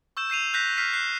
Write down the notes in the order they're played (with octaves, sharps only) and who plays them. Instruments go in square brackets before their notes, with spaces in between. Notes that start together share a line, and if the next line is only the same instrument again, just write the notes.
[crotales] C#6 E6 G6 E7
G6 C7 D#7 F7
F#6 G6 A#6 B6
F6 B6 C7 D#7
F#6 C7